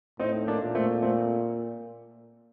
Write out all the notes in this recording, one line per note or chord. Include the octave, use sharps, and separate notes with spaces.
A2 C4 D#4
A#3 D4
A#2
A3 C4
A3 C4